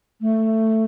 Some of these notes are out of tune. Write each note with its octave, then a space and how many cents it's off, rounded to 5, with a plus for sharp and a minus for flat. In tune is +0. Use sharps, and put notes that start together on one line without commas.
A3 +10